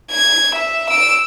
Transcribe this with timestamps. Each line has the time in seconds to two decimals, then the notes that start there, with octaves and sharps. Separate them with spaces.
0.11 G#6
0.55 E5
0.90 E6 D7